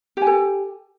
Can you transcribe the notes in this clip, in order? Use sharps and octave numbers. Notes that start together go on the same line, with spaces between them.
G4 A4 G#5